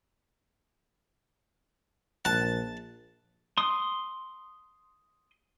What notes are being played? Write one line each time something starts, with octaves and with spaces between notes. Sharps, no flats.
A#1 A5 F#6
C6 D#6